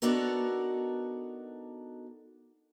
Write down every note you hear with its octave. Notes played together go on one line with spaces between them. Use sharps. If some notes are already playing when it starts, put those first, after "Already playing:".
B3 D4 D#4 F#4 A4 A#4